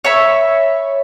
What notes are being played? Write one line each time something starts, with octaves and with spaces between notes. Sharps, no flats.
C#5 E5 B5